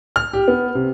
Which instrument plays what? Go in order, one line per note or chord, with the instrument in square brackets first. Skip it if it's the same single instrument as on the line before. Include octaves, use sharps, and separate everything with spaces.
[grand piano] F6
G4
B3
C3